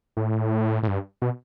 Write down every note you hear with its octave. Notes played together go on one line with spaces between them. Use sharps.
A2
A2
G2
B2